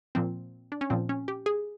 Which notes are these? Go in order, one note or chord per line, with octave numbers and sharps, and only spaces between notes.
A#2 F3 C4
D4
C#4
A#2 F3 C4
C#4
G4
G#4